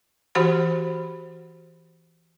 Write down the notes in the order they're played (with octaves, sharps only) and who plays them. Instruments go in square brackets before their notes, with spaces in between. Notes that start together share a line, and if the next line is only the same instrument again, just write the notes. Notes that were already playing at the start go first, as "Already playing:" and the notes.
[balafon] E3 F#4 G4 C5 F#5 B5